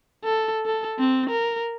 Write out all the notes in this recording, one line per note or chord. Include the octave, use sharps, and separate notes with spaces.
A4
A4
C4
A#4